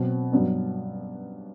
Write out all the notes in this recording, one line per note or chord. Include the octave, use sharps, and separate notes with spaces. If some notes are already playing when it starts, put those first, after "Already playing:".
Already playing: B2 F#3 C4
G2 F#3 B3